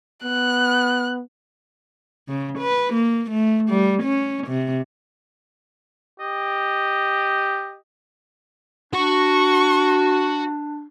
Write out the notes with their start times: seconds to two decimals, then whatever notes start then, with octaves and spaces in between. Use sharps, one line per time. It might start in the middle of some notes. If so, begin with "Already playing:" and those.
0.24 B3 F#6
2.29 C#3
2.58 B4
2.94 A#3
3.31 A3
3.70 G3
4.03 C#4
4.48 C3
6.20 G4 D#5
8.93 D4 F#4 C#6